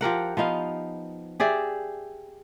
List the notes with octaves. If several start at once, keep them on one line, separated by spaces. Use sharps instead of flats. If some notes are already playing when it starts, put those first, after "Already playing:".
F3 G4 A#4 F#5
F3 B3 D#4 F5
G4 G#4 D5 E5